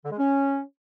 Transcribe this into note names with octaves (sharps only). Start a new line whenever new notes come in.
D3
G#3
C#4